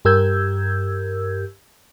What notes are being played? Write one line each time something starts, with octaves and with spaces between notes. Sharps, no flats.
G2 G4 A#4 E6 G6 G#6